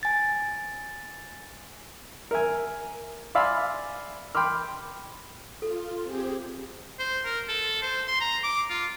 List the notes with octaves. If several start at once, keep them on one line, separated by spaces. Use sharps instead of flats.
G#5 A6
A#4 E5 G#5
D5 E5 F5 G#5 B5 C6
G5 B5 C6 D6 F6
F4 A4
C4 G4 G#4
C5
A#4
A4
C5
C6
A#5
D6
F4